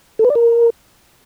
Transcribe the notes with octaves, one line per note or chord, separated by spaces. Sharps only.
A4
B4
D5
A#4